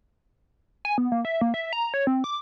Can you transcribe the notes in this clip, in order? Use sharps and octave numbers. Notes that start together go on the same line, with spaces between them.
G#5
B3
A#3
E5
A#3
E5
A#5
C#5
C4
D6